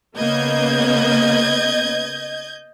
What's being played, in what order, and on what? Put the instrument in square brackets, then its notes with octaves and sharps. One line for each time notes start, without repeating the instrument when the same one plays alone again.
[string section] C#3 A#3 B3 [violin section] D#5 G6 G#6